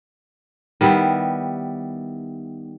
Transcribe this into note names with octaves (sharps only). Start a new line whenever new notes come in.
D#3 G3 B3 E4